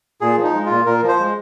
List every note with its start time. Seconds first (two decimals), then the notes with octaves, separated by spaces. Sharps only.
0.21 A#2 G#4
0.38 F3
0.44 D#4
0.54 G#3
0.65 A#2 F4
0.86 A#2 A#4
1.03 F3
1.08 C5
1.19 G#3